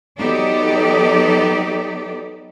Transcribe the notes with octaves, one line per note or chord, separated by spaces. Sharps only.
F#3 B3 D#4 G4 A4 D5